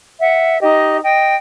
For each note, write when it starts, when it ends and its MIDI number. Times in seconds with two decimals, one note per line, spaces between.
0.21 0.57 76
0.21 0.57 78
0.61 0.98 63
0.61 0.98 67
0.61 0.98 75
1.03 1.36 75
1.03 1.36 79